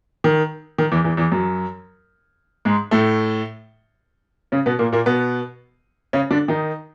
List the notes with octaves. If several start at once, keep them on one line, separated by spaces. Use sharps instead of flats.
D#3
D#3
E2 E3
E2 E3
E2 E3
F#2 F#3
G#2 G#3
A2 A3
C#3 C#4
B2 B3
A#2 A#3
A#2 A#3
B2 B3
C#3 C#4
D3 D4
D#3 D#4